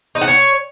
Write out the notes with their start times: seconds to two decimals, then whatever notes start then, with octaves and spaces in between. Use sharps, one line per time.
0.15 D#4
0.21 F#5
0.28 C#5